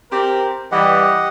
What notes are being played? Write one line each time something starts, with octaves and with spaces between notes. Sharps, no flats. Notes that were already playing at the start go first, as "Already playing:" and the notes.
C4 G4 A#4
E3 G3 G4 D#5 F#5